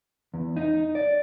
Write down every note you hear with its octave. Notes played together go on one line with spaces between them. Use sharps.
E2
D#4
D5